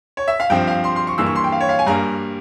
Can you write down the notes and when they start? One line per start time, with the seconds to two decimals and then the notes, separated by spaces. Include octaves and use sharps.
0.17 C#5
0.28 E5
0.40 F5
0.50 G2 F3 C4 G5
0.67 F5
0.84 C6
0.96 C6
1.07 C#6
1.18 G2 E3 A#3 E6
1.26 C#6
1.36 C6
1.44 G5
1.52 F5
1.61 C#5
1.69 F5
1.79 G#5
1.87 G2 G3 A#3 A#5